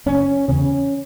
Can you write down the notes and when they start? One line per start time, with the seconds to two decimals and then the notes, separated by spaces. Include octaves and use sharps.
0.06 F#1 C#4
0.48 E2 C#3 C#4